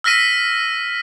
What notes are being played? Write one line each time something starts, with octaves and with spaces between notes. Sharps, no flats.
E6 F6 A#6 B6 D#7